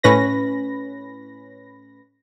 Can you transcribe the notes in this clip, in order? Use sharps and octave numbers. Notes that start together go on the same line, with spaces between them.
A2 C#4 B4 B5 A#6